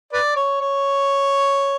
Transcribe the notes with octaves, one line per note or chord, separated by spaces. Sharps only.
B4 D5
C#5
C#5